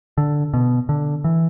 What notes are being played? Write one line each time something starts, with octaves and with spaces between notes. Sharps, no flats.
D3
B2
D3
E3